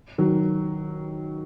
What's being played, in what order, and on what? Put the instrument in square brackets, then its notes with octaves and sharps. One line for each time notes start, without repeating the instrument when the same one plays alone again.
[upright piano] D#3 F#3